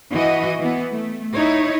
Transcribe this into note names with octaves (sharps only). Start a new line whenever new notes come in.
E3 F#4 D#5
E3 B3
A3
D#4 E4 C#5